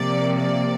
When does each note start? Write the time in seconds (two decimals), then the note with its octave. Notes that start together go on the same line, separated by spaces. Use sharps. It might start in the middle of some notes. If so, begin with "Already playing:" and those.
Already playing: C3 F3 A#3 D5
0.37 D5